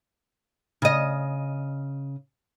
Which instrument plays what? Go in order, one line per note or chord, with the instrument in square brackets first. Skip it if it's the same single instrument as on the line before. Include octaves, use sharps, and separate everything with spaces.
[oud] C#3 D#5